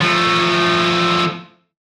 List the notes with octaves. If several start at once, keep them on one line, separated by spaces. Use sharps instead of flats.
F3 A3